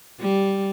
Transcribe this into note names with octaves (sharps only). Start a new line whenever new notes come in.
G3